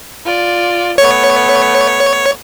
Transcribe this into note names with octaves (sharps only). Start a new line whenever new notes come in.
F4 D5
A3 B3 C#5